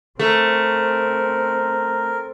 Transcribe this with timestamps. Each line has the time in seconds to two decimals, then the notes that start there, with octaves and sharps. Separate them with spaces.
0.19 A3 C4 A#4